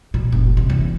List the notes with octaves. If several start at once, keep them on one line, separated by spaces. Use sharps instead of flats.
A#2
F#1
C3
E2